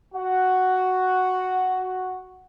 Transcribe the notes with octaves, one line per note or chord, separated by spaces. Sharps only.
F#4 F#5